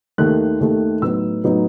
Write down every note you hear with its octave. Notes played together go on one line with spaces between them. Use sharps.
D#2 D#3 A3 F#6
D#2 D#3 A3
A2 F#3 B3 D#4 E6
A2 F#3 B3 D#4